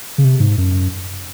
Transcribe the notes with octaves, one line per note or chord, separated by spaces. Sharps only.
C#3
C3
G#2
F#2